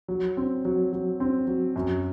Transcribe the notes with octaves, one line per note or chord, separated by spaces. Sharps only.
F#3
C4
F#3
F#3
C4
F#3
F#2